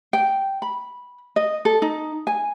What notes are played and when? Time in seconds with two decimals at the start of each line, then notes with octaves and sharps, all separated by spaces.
0.13 G5
0.62 B5
1.36 D#5
1.65 A4
1.82 D#4
2.27 G#5